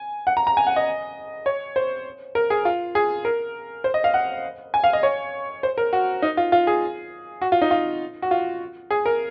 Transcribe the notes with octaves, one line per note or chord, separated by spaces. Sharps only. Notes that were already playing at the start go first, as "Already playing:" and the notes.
Already playing: G#5
F#5
A#5
A#5
G#5
F#5
D#5
C#5
C5
A#4
G#4
F4
G#4
A#4
C5
D#5
F5
F#5
G#5
F5
D#5
C#5
C5
A#4
F#4
D#4
F4
F4
G#4
F#4
F4
D#4
F4
F#4
F4
G#4
A#4